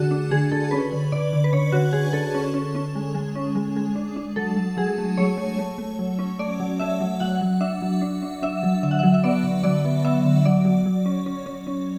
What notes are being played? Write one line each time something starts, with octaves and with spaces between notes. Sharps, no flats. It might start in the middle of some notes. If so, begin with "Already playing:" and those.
Already playing: D3 A3 D4 F#4 G#4 A4
D4
D3 G#4
D3 A4
C#4 B4
D3
D3 D5
D3
B4
D3 C#5
D3 F#4
D3 G#4
D3 A4
C#4
C#4
C#4
G#3
G#3
C#4
G#3
G#3
D4
D4
F#3 A4
F#3
F#3 G#4
A3
F#3 C#5
A3
A3
A3
F#3
C#4
A3 D5
F#3
A3 E5
F#3
F#3 F#5
F#3
D4 E5
F#3
D4
D4
D4 E5
F#3
D3 E5
F#5
F#3 E5
E5
B3 D5
D3
F#3 D5
B3
B3 E5
D3
F#3 D5
F#3
F#3
C#4
C#4
C#4
C#4